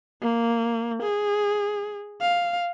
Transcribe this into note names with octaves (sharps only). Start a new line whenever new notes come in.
A#3
G#4
F5